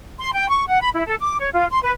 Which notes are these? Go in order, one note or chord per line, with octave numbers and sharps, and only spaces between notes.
C6
G5
C#6
F#5
B5
E4
A4
D6
C#5
F4
C6
B4